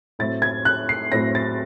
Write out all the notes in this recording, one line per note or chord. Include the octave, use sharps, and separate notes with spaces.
A2 F#3 A3 C4 A6
G#6
F#6
C7
A2 F#3 A3 C4 A#6
A6